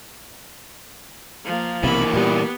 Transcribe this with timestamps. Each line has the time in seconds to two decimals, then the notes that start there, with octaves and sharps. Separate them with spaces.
1.45 F3 A#3
1.84 B1 C3 E3 A#3 B3 B5
2.14 A#2 G3 B3 G4